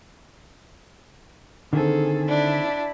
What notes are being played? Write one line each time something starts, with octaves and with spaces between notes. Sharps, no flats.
D3 D#3 C4 G#4 A4
D4 E4